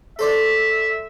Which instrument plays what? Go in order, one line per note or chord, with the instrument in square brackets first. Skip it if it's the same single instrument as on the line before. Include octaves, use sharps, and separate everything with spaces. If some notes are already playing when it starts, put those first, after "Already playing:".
[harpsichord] A4 C5 D5 [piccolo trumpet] E5